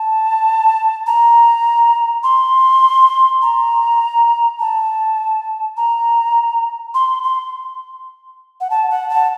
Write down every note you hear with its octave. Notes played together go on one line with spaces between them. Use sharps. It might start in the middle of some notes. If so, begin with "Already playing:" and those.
Already playing: A5
A#5
C6
A#5
A5
A#5
C6
C6
F#5
A5
F#5
A5